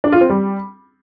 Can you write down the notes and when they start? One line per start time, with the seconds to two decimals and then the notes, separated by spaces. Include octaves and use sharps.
0.04 D4
0.12 F4
0.21 C4
0.29 G3